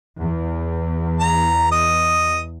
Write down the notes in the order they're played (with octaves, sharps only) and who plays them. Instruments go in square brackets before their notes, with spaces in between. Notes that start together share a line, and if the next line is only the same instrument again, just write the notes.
[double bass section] E2
[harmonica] A#5
D#5